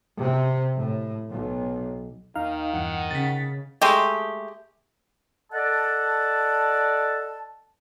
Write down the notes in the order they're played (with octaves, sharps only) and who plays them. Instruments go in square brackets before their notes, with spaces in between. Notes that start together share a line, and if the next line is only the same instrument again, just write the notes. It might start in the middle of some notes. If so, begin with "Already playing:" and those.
[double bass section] C3
A2
B1
[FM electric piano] D#2 F5 [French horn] D#3 [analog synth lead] D#4
[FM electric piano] E2 G2 [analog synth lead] F#5
[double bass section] C#3 [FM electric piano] A6 B6
[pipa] G#3 A3 G4
[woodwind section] A4 D5 D#5 F#5 A5